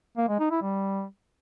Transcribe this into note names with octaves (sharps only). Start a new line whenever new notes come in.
A#3
G#3
D#4
E4
G3